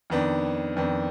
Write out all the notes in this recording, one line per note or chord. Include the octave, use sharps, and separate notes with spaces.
F2 D#3 B3 D4
F2 D#3 B3 D4